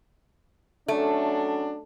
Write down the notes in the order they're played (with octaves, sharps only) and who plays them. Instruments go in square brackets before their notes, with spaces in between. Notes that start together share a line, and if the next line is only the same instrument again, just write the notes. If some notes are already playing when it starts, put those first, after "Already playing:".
[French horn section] F#3 C#4 D4 [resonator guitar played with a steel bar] A3